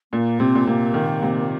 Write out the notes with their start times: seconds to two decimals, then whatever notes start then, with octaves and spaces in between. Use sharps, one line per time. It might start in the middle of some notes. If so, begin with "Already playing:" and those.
0.13 A#2 A#3
0.39 C3 C4
0.55 A#2
0.67 C3 A#3
0.94 D#3
1.23 C3